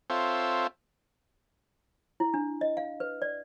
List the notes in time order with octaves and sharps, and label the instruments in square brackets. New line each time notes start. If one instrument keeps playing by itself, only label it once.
[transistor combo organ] C4 F4 A4 C5 C#5 E5
[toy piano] E4
D4
D#5
F5
B4
D5